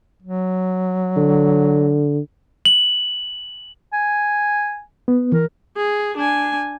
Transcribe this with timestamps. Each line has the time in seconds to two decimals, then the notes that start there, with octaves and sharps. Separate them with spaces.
0.22 F#3
1.17 D3
2.65 F#7
3.93 G#5
5.08 B3
5.32 E3 A#4
5.76 G#4
6.17 D4 G#5